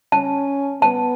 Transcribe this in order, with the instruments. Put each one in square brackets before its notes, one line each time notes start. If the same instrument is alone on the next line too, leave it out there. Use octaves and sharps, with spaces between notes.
[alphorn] C#4 [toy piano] A5
[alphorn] B3 [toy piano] A5